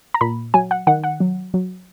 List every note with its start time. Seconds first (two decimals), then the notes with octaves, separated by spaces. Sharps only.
0.14 A#5
0.21 A#2 B5
0.54 F#3 G#5
0.71 F#5
0.87 D#3 F#5
1.04 F#5
1.20 F#3
1.54 F#3